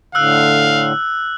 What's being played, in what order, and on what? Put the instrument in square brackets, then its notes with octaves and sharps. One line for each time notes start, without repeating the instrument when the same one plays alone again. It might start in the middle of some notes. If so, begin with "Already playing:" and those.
[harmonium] A2 D3 [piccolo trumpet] F5 [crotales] E6 F#6